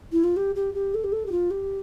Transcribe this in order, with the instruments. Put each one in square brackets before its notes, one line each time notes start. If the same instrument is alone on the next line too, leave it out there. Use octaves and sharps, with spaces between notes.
[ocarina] E4
F4
G4
G4
G4
A4
G4
A4
G4
F4
G4